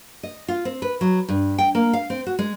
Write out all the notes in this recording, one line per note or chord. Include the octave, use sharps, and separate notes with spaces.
D#5
F4
C4
B4
F#3
G2
G5
A#3
F5
C4
F#4
G#3